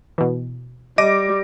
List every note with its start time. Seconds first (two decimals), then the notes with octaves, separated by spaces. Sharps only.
0.18 B2 E3
0.98 G3 D#5 D6 A#6 D7